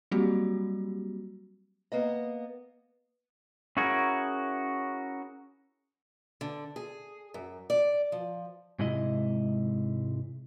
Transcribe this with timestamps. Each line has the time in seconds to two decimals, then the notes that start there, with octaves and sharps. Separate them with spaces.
0.11 F#3 G3 A#3 C4 F#4 G4
1.92 A#3 B3 D#5
3.77 C#4 E4 F#4 G#4 A#4
6.41 D3
6.76 G#4
7.34 F#2
7.70 D5
8.12 F3
8.79 G#2 C3 G#3 E4 D#5